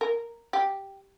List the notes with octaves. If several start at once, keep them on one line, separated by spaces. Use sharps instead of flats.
A#4
G4